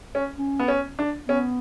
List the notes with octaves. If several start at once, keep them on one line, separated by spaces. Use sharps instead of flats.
C#4
C#4
B3
C#4
D4
B3 C#4